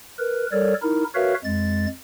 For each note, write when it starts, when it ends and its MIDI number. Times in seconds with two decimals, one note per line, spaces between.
0.19 0.47 70
0.19 0.47 71
0.52 0.74 55
0.52 0.74 69
0.52 0.74 70
0.52 0.74 73
0.52 0.74 74
0.82 1.04 63
0.82 1.04 64
0.82 1.04 70
1.15 1.34 66
1.15 1.34 70
1.15 1.34 71
1.15 1.34 73
1.15 1.34 76
1.15 1.34 77
1.44 1.86 41
1.44 1.86 56
1.44 1.86 93